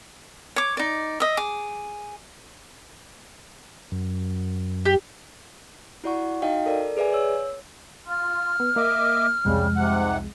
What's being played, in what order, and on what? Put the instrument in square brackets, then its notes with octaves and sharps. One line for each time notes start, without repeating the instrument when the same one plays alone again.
[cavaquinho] C#5 D6
D#4 D5
D#5 E5
G#4 D6
[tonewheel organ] F#2
[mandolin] G4
[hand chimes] E4 F#4 D5 F#5 C#6
D#4 F#4 D#5 F5 G5
A4 A#4 D5
G#4 B4 D5 E5 G#5
C#5 E6
[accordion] F4 [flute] F6
[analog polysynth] B3
[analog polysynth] A#3 [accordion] D#5 E5 D6
[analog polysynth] C2 F2 G#3 [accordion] C#3 G3
[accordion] G#2 C3 F#5